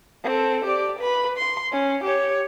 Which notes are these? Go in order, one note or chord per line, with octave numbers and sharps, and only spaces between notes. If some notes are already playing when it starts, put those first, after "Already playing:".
C4 A4
G4 D5
B4 B5
C6
C#4
G4 C#5